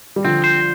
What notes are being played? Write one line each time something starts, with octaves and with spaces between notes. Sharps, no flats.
G3
D3 F3 C4
C5